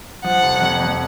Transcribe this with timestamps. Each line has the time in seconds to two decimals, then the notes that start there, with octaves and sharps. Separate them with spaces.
0.24 F3 F#5
0.43 F1
0.62 F2
0.80 F2